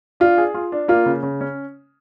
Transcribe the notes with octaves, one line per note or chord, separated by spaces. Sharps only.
D4 F4
G#4
F4
D4
A#3 F4
C#3
C#3
C#4